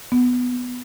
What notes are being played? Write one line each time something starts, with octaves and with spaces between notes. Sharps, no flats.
B3